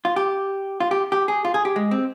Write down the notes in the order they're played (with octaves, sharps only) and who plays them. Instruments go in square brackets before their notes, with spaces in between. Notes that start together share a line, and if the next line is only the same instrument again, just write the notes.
[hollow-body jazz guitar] F4
G4
F4
G4
G4
G#4
F4
G#4
G4
G#3
C4